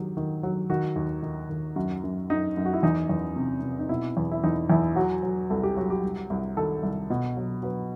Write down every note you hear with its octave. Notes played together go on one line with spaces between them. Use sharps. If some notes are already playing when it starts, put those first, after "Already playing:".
Already playing: D#3 F#3 G4
D#3
F#3
D#3 F#4
D#2
D#3
D#2
F#2 F#4
F#2
F#2 D#4
F#2
F#4
E4
E2 D#4
E2
C3
C3
D#4
B2 E4
E2
E4
E2 D#4
E2 E4
F#3 F#4
F#3
C2 A4
G4
F#3 F#4
G4
C2
C2
D#3 A4
C2
B2
F#3
F#3 B4